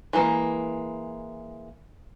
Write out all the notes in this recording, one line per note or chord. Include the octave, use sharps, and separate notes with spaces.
E3 G#3 A#3